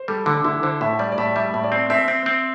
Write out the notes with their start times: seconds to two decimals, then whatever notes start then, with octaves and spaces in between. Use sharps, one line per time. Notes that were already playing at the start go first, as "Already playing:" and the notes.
Already playing: C5
0.08 G3 A4
0.26 D3 D4
0.44 D3 E4
0.62 D3 C5
0.81 A2 E5
0.99 G3 D5
1.12 D5
1.18 A2 E5
1.35 G3 E5
1.54 A2
1.63 D5
1.72 C4
1.90 C4 E5
2.08 C4
2.26 C4